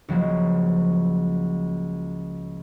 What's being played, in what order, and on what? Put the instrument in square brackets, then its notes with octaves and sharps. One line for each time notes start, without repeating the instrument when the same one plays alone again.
[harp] C#2 F3 F#3 A#3